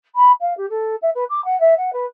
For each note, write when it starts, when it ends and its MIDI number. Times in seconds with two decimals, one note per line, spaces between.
0.15 0.31 83
0.40 0.55 77
0.57 0.66 67
0.69 0.95 69
1.02 1.10 76
1.14 1.24 71
1.29 1.43 86
1.44 1.58 78
1.60 1.74 76
1.77 1.90 78
1.92 2.05 71